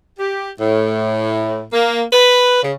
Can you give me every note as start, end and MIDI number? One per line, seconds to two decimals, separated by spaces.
0.19 0.51 67
0.60 1.66 45
1.72 2.04 58
2.13 2.58 71
2.63 2.74 49